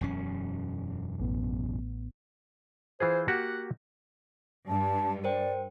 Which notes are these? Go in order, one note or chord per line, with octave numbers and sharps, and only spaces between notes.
E1 F#2 C#4
A1 A2 B3
E3 F4 G#4 C5
A#3 F#4 G4 F#5
G2 A5
A#4 C5 D5 G5